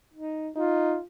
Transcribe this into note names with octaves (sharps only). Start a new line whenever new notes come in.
D#4
D#4 F4